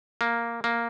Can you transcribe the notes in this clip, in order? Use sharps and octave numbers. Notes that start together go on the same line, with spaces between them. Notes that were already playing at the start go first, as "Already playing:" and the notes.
A#3
A#3